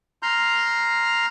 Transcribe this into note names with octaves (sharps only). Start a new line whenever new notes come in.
A#5 C6 F6 G6